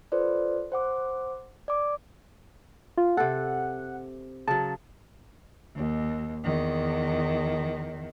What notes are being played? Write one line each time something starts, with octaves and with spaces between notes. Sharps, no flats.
F4 A4 B4 C5 D5
C5 F#5 D6
D5 D6
F4
C3 A4 F#5
C#3 F#3 A5
D#2
E2 D#3